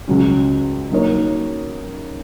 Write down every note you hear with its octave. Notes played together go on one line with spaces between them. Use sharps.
C#2 C#3 F#3 C#4
F#3 A#3 D#4 A#4 C#5